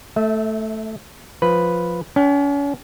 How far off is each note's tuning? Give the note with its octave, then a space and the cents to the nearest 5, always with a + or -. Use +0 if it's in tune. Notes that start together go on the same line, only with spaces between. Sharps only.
A3 +0 E5 -30
F3 +5 B4 +0
C#4 +40 G5 +0